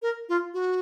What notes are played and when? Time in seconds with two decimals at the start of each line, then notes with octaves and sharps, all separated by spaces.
0.02 A#4
0.29 F4
0.54 F#4